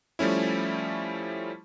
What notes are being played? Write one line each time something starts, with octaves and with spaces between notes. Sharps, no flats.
F3 G3 A3 C#4 E4